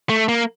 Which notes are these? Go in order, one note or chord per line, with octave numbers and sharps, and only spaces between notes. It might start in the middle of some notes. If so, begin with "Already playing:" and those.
A3
A#3